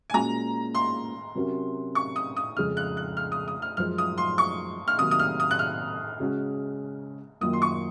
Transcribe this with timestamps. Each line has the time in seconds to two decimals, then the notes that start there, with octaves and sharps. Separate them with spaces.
0.10 G#5
0.14 A#2 G#3 C#4 F#4 A#5
0.75 C6
1.35 C3 F#3 C#4 F#4 A#4
1.95 C#6
2.16 D#6
2.37 D#6
2.57 F2 C#3 G#3 C#4 F6
2.77 F#6
2.97 F#6
3.17 F6
3.32 D#6
3.48 D#6
3.62 F6
3.77 F#2 F3 G#3 F6
3.98 D#6
4.18 C6
4.38 C#6
4.88 F6
4.98 C3 D#3 F#3 A#3 D#6
5.11 D#6
5.19 F6
5.40 D#6
5.51 F#6
5.59 F6
6.20 C#3 G#3 C#4 F#4
7.41 F#2 D#3 A#3 F4 D#6
7.53 C6
7.62 C#6